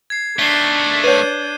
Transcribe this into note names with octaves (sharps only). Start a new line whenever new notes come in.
G#6 C7
D#3 A3 D4 C7 G7
B4 C#5 G6 C7 D#7